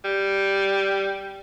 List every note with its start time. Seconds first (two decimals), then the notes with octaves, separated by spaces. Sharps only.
0.04 G3